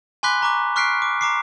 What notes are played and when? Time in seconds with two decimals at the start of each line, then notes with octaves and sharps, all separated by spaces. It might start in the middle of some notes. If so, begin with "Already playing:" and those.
0.23 G#5 B5 C6 D6 F#6 B6
0.42 A#5 C#6 D6 F#6
0.76 C#6 F6 F#6 B6 C7 D7
1.02 D6
1.21 A#5 D6 C7